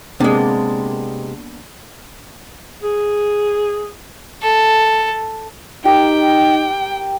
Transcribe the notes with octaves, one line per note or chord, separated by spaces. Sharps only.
C3 G#3 A#3 B3 D4
G#4
A4
D#4 G4 A#4 G5